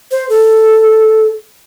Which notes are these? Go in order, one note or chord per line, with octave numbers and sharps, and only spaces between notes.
C5
A4